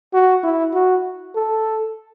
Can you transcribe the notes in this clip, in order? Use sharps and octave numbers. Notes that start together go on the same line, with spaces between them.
F#4
E4
F#4
A4